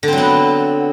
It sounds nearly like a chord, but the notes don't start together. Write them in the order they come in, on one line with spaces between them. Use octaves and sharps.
D3 C4 F#3 B3